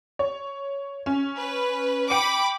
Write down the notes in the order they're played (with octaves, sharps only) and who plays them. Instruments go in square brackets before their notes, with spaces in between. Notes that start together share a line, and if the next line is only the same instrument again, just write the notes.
[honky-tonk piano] C#5
C#4
[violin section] B4
[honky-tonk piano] G5 C#7 D#7 [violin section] B5 D6